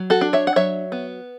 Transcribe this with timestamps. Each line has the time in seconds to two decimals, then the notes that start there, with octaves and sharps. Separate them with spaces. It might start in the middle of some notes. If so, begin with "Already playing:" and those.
Already playing: F#3
0.10 F#4 A4
0.21 D4
0.33 C#5 E5
0.47 F#5
0.56 F#3 C#5 E5
0.92 B3